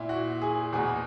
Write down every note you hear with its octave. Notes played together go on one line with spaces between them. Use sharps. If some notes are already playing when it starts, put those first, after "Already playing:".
Already playing: A#2 E4
F#4
G#4
E2 B2 G#4